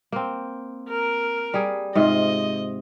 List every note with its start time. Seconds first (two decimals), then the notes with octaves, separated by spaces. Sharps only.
0.12 A#3 C4
0.90 A#4
1.54 G3 G#4
1.95 G#2 C3 F4 D#5